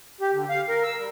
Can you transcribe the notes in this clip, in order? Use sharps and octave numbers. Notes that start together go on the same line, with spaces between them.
G4
D3
F5
A#4
E6
G3